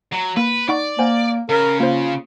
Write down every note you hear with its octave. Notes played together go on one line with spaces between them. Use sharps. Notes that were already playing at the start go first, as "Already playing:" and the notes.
F#3
A#3 B4
D#4 D5 F#5 C#6
A#3 C5 F#5 G#5
C#3 A#4
A#3 F4 C5